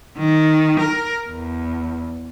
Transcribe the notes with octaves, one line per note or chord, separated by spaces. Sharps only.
D#3
A#4
E2